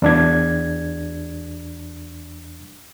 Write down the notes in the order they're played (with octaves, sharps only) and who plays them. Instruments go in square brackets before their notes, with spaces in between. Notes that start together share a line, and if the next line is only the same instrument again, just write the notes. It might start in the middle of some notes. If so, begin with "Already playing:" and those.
[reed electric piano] E2 D4 G#6